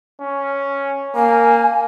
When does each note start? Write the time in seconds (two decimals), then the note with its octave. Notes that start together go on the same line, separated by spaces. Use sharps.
0.22 C#4
1.16 A#3 G#5